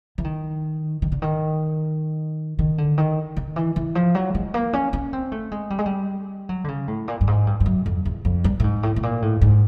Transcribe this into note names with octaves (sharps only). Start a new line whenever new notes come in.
E3
D#3
D#3
D3
D#3
D#3
D3
D#3
D#3
E3
E3
F3
F#3
G#3
A#3
C#4
C#4
C4
A3
G#3
G3
G#3
G3
F#3
D3
C#3
A2
A#2
G2
G#2
G2
G2
F#2
F2
E2
F2
G2
A2
G#2
A2
A2
A#2
A2
G#2